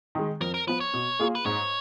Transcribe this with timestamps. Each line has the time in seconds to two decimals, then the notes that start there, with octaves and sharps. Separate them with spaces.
0.15 D#3 G#3
0.41 F2 A#4
0.54 A#4
0.67 F3 B3 B4
0.80 C#5
0.94 B2
1.19 A#3 F4 G#4
1.35 B4
1.45 G#2 C#5